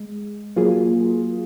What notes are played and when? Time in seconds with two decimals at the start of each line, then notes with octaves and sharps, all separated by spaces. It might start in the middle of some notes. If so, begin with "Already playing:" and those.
Already playing: G#3
0.56 F#3 A#3 F4 G#4